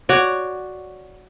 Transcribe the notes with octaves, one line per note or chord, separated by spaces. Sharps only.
F#4 C#5 D5